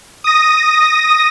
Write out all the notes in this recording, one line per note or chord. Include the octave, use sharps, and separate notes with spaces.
D#6 A#6